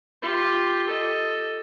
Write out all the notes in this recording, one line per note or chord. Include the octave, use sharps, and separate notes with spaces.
F4 G4
A4 D#5